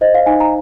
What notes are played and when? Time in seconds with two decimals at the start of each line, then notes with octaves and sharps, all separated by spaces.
0.01 C5 D#5
0.15 F5
0.26 D#4 G#5
0.40 A#5